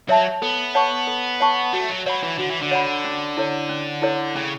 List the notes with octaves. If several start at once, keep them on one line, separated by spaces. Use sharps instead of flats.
F#3 C#5 E5 A5
B3 A4
C#5 F#5 A5 C#6
A4
C#5 F#5 A5 C#6
A3 F#4
F#3
F#3 C#5 F#5 B5
E3
D3 F#4
E3
D3
C#5 F#5 B5
C#4
E4 A4 C#5
C#4
E4 A4 C#5
C#3 C#4